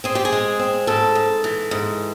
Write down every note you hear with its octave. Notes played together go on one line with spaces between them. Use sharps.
C4 G#4
G4
G#4
G#3
C4
G#2 A4
G#2
E3
G#2